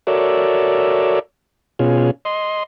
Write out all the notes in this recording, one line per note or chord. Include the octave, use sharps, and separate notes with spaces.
F#4 A4 A#4 C#5 D5 E5
B2 C#4 F4 G#4
D#5 C6